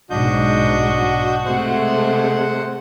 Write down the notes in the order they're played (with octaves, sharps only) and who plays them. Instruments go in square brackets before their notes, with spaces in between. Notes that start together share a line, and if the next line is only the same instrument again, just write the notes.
[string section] B1 G#2 [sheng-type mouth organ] D4 D#5 G6 [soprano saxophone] F#4
[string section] C3 G#3 A3 [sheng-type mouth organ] C5 F#5